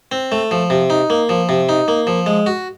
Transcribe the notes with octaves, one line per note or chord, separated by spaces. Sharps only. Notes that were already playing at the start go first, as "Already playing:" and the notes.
C4
A3
F3
C3
D#4
A#3
F3
C3
D#4
A#3
F3
G#3
F#4